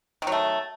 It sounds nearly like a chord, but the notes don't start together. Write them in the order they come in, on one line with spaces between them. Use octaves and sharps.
D#3 F#3 A3